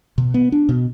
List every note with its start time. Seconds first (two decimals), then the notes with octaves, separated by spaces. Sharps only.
0.18 B2
0.34 B3
0.52 D4
0.69 B2